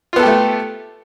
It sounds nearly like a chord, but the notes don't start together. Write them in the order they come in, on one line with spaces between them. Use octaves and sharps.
F4 B3 A4 G4 A3